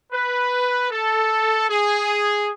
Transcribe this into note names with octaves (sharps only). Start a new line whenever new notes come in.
B4
A4
G#4